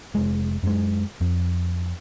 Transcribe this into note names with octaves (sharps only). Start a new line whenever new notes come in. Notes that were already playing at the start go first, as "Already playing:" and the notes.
F1 G#3
F#2 G#3
F2